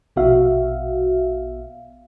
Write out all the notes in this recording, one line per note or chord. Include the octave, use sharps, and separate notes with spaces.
A#1 B2 B3 F#4 E5 F5